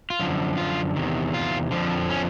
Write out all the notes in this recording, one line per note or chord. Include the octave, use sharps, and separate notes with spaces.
F4
F#2 D3 F3
F4
E2 C3 D#3
F4
F2 D3 F3
C#4